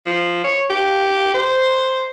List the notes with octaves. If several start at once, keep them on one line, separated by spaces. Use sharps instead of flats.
F3
C#5
G4
C5